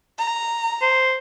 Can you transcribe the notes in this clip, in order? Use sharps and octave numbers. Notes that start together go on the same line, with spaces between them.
A#5
C5